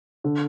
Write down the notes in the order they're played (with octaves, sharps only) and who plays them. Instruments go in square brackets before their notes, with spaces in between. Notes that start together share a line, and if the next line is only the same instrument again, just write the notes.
[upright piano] D3